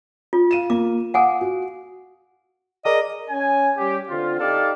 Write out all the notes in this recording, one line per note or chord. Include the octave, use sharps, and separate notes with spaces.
F4
F5 D#7 E7
A#3 D6
F5 F#5 G#5 D6 D#6
F#4
G#4 A#4 D5 D#5
C#4 G#5
G3 C#4 G4
D3 C4 F4
D#4 G4 A4 D5 F5